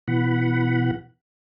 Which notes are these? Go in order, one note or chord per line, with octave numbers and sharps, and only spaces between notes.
B2 E3 F#5 B5